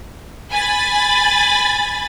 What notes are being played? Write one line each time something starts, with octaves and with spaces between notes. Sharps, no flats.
G#5 B5 A6